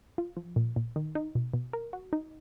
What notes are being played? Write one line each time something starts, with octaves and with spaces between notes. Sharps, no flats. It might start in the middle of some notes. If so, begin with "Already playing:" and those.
F4
F3
A#2
A#2
D#3
D#4
B2
B2
A#4
F#4
D#4